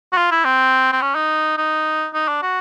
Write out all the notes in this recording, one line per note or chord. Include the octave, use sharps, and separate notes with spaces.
F#4
F4
E4
C4
C4
C#4
D#4
D#4
D#4
D4
F#4